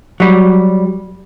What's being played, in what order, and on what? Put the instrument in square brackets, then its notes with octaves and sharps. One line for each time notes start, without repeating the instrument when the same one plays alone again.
[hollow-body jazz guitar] F#3 G3